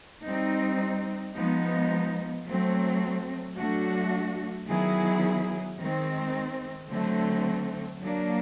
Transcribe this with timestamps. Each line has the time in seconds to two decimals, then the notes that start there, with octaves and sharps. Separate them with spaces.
0.25 G3 C4 D#4
1.36 F3 G#3 B3 D#4
2.47 F#3 A3 C4
3.58 F#3 A3 D4 F#4
4.69 D#3 F#3 B3 E4 G#4
5.79 D#3 G#3 C4
6.90 D3 F#3 A3 C4
8.01 F#3 A#3 D4